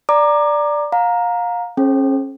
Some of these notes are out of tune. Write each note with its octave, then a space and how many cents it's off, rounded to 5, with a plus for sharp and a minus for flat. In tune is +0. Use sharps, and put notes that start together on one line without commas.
D5 +0 A#5 +0 D6 +25
F5 +25 A#5 +0
C#4 -30 G#4 +40 C5 +30